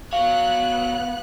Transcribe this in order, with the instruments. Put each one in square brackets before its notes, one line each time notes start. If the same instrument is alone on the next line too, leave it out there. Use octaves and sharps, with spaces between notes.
[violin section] B3 F#6 [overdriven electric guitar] F#4 C#5 [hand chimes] F5